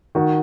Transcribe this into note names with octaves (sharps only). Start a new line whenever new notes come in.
D#3 F#4